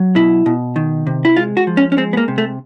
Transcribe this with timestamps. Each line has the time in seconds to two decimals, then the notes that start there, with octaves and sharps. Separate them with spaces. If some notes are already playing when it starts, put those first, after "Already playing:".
Already playing: F#3
0.15 B2 E4
0.46 B2
0.76 D#3
1.07 C3
1.25 E4
1.36 G#3 F4
1.57 F#4
1.67 F3
1.77 C#4
1.92 C#4
1.97 G#3 C4
2.13 B3
2.17 A#3
2.28 C3
2.38 A3